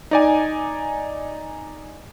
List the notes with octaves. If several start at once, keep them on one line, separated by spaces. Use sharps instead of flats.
D#4 D5 G#5